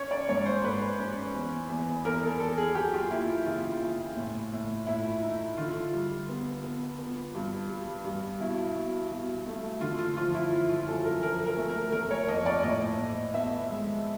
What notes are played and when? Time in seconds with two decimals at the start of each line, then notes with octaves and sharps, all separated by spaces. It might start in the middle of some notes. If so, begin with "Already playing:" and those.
Already playing: C#4 C#5
0.11 D5
0.29 G#2 C#5
0.46 C5
0.63 G#2 B4
1.00 C#4
1.34 E2
1.69 E2
2.04 E2 A#4
2.23 A4
2.40 E2 A4
2.58 G#4
2.75 F#3 G4
2.94 F4
3.11 A#3 E4
3.46 C#3 F4
3.82 C#3
4.16 A2
4.53 A2
4.87 A2 E4
5.22 D#4
5.57 D3 F4
5.93 G3
6.29 B3
6.64 B3
6.98 B3
7.34 G2
7.69 G3
8.05 G2
8.40 B2 E4
8.75 B2
9.11 B2
9.46 A3
9.81 D3 F4
9.98 F4
10.17 F3 F4
10.34 E4
10.51 F3
10.69 F4
10.88 F#2 A4
11.04 A#4
11.22 F3 A#4
11.46 A#4
11.57 A3
11.70 A#4
11.92 A3 A#4
12.11 C#5
12.28 F2 D#5
12.46 D5
12.63 A2 D#5
12.98 A2
13.34 B3 E5
13.70 G#3